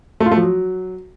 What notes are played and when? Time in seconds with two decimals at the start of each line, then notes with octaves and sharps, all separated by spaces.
0.20 A3
0.26 F4
0.32 A3
0.37 F3
0.43 F#3